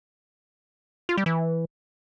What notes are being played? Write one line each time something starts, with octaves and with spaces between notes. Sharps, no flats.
F4
G3
E3